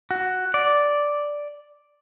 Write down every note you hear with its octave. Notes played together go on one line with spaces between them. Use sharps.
F#4
D5